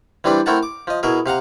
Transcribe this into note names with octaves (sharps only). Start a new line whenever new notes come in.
E3 G3 C4 D4 B4
A3 C4 E4 A#4 F#5 A5
D6
F3 D#5
B2 E4 G#4 A#4
C3 F5 F#5 A#5